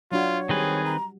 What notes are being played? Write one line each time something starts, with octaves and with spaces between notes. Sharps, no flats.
F#3 D4 F4 F#4 C#5
D#3 G3 C4 G#4 B4
A#5